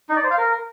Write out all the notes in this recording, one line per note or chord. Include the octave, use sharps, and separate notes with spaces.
D#4
D5
C5
F5
A#4